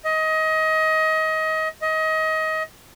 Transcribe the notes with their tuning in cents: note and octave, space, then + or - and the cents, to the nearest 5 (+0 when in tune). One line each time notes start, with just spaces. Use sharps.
D#5 +25
D#5 +25